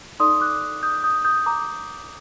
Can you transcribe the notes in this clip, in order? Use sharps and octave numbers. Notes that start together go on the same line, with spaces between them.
D#4 A4 D5 C6 D#6
D6 F#6
D#6 G6
D#6 G6
D#6 G6
A#5 D6